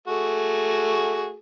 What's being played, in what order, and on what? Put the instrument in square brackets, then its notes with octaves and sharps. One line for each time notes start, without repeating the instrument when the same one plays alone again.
[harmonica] A3 F#4 G#4